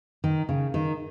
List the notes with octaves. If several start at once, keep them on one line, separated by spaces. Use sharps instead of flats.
D#3
C#3
D#3